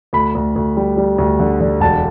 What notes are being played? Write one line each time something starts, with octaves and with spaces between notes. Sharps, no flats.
D2 B5
D2
D2
G3
G3
D2
D3
D3
E1 A5